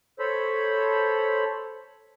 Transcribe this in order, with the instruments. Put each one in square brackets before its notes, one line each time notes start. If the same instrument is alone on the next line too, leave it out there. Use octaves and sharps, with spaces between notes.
[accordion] A4 C5 C#5 B5